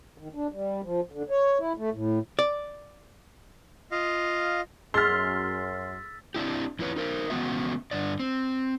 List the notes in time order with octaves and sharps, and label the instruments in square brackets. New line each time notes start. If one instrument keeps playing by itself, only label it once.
[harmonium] D#3
D4
G3
F3
D3
C#5
E4
A3
A2
[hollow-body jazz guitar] D5
[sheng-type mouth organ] F4 D#5 F5
[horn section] F#2 [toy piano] G#4 D#5 [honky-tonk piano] C6 F6 [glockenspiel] E6 A6 B6
[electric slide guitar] C4 D4 E4 G4
E2 E4 B4 C#5
D#4 A#4 C5
C#3 E3 G#3 B3 F#4 E5
G2 D3 D5
C4